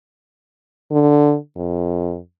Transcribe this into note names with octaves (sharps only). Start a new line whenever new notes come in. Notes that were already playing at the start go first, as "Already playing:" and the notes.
D3
F2